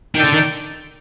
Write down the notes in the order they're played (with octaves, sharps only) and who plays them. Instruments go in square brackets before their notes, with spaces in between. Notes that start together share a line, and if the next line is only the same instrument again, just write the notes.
[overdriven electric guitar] D#3 [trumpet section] D4 A4 D5 G5
[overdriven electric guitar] D3
D#3